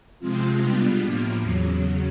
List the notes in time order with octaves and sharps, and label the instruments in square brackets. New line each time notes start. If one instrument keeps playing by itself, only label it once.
[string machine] C3 F3 G#3 C4 F4
B2 G3 B3 D4 F4
A2 F3 A#3
E2 C#3 F#3